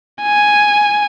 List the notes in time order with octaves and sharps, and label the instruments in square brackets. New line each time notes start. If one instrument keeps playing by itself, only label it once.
[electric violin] G#5